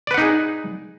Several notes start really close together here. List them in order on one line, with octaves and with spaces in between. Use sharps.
D5 B4 F#5 D#4 G#4